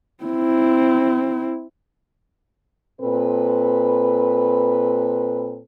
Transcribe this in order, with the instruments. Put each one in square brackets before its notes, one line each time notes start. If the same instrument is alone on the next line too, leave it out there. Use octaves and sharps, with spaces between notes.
[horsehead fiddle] C4 E4
[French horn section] A#2 C4 A4 B4